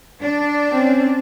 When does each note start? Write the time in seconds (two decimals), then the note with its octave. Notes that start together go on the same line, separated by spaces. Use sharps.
0.22 D4
0.72 C4 C#4